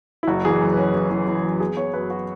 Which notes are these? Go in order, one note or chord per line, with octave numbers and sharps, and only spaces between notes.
E4
F#1 F#4
E3 G#4
F#4
F#2
C#4 B4
E3
E3
E3
F#2
B3 G#4
B3 C#5
F#2 B4
F#3 F#4